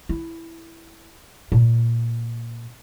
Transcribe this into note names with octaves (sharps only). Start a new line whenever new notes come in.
E4
A#2